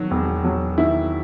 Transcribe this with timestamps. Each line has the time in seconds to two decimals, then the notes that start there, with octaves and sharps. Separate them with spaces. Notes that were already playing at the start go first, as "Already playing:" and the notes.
Already playing: D#3 F#3
0.11 E1
0.44 F#3
0.78 D#3 E4